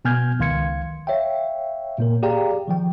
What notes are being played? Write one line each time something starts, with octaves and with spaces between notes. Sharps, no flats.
B2 B3 G#5 F6 G6 G#6
C#2 D#3 F5 C6 G#6 C#7
C#5 E5 F5 G5
A#2 A#3 A#4
G4 G#4 D5 F5 G5 A#5
D#3 F3 G5